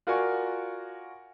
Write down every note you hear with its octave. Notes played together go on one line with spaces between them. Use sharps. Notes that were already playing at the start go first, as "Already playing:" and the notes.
F4 F#4 A#4 D5 G#5 C#6